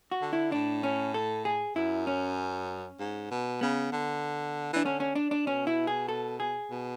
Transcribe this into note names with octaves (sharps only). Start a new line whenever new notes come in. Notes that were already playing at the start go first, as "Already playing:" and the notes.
F#4
D3
E4
A2 D4
C#4
A4
G#4
F#2 E4
C#4
G#2
B2
C#3 B3
D3
E3 D4
D3 C#4
C#4
D4
D4
B2 C#4
E4
G#4
A4
G#4
B2